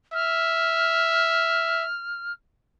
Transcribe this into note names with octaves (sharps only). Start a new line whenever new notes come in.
E5 F6